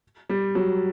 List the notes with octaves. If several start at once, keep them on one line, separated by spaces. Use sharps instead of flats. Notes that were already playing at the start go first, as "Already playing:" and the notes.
G3
F#3